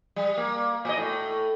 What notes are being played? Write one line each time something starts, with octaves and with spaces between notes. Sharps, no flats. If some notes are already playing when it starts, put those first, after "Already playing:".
G3
A#3
A#2 D#5
A2